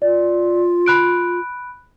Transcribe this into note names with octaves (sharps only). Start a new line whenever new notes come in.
F4 D5
B5 F#6 D7